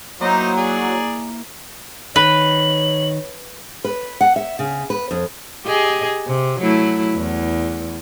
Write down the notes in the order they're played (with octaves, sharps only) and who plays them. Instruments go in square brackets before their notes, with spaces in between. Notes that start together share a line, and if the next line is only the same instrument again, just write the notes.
[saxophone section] F#3 [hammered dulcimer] A#3 E4 A#4 [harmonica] D#4 C5 D#5
[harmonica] G#4 D5
[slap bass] D#3 [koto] B4 [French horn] C#5 [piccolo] F#7
[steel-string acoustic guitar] B4
F#5
E5
C#3
B4
F2
[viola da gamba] G4 G#4 D#5
C3
F#3 A3 E4
E2